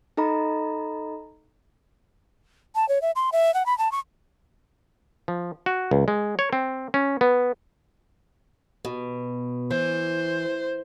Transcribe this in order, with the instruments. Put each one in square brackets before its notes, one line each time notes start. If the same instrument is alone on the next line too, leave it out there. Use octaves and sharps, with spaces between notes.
[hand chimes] D#4 A4 D#5 A#5 B5
[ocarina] A5
C#5
E5
C6
E5
F#5
B5
A5
C#6
[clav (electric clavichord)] F3
F#4
C#2
G#3
C#5
C4
C#4
B3
[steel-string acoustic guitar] B2
[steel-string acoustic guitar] E3 [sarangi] C5